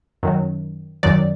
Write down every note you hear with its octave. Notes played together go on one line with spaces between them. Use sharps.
F#2 D#3 F#3
F#2 D#3 F#3 D5